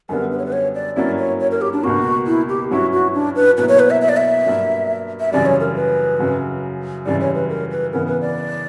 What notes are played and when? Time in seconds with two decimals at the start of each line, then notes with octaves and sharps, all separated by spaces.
0.09 F#2 D3 G3 B3 A#4
0.31 B4
0.38 C#5
0.46 B4
0.52 C#5
0.75 D5
0.96 G2 F#3 A#3 C#4 E4 D5
1.18 C#5
1.40 C#5
1.51 A#4
1.62 G4
1.73 D4
1.83 C#2 B2 A#3 F#4
2.27 E4
2.49 G4
2.71 G2 F#3 C#4 E4 F#4
2.92 F#4
3.14 D4
3.36 B4
3.57 B2 F#3 A#3 E4 B4
3.69 C#5
3.79 B4
3.90 E5
4.01 E5
4.09 D5
4.17 E5
4.45 G2 F#3 A#3 D4
5.20 E5
5.32 F#2 C#3 E3 G3 D5
5.46 C#5
5.60 A#4
5.75 B4
6.19 F#2 C#3 F#3
7.06 F#2 C#3 E3 G3 D5
7.21 C#5
7.35 B4
7.49 A#4
7.71 B4
7.93 C#3 E3 B3 A#4
8.07 B4
8.21 D5